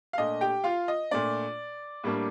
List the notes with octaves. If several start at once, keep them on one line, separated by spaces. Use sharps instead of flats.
F5
A#2 A3 D4 D#5
G4 G5
F4 F5
D#5
A#2 A3 D4 D5
A2 G3 A#3 D4